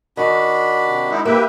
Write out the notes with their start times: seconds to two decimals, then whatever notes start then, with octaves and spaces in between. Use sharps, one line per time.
0.17 D#3 D4 F#4 B5
0.85 C3
1.10 G#3 D#4 E4
1.25 A#3 G4 B4 E5